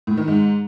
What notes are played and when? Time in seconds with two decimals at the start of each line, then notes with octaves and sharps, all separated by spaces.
0.07 A2
0.17 D#3
0.28 G#2